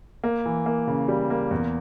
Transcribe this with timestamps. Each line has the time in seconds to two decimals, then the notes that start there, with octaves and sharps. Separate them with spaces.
0.24 A#3
0.46 E3
0.66 A#3
0.87 C#3
1.08 G3
1.30 A#3
1.51 E2